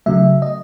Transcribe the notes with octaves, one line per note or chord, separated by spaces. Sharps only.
C#3 F#3 A3 E5
D#5